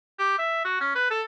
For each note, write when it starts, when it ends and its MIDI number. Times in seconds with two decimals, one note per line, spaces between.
0.19 0.38 67
0.39 0.61 76
0.64 0.78 66
0.81 0.93 61
0.95 1.07 71
1.11 1.22 69